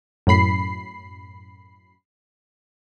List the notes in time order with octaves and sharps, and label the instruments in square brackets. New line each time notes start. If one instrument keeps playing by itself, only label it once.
[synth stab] F#2 A2 B5 C7